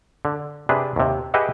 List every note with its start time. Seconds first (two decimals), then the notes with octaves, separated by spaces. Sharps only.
0.25 D3
0.69 C3 D4 G#4 B4
0.96 D#2 C3
1.34 G4 G#4 B4 D#5 E5 F#5